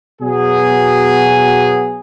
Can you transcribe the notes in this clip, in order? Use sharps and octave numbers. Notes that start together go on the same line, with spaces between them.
B2 F#3 B3 G#4